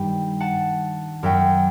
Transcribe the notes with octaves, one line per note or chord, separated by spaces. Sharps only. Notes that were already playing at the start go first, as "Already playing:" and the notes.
Already playing: G2 D#3 G3 G5 B5
F#5 A5
F#2 F#3 E5 G5